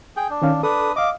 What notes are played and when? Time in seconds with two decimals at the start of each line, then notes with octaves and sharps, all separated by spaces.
0.17 G#4 G5
0.30 D4
0.42 D#3 C#4 F5
0.63 D4 A4 B4 D#6
0.96 D#5 F5 D6